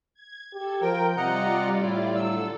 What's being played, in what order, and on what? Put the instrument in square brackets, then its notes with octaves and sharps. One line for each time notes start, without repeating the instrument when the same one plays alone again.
[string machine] G#6
[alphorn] G4 [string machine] A4 G#6
[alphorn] F3 [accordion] A#4 G5 [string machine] G6
[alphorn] C3 [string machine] G3 F4 D5 [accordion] D#5 F#5 A#5
[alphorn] A2 [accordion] E4
[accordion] D3 F#3 E6 [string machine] A4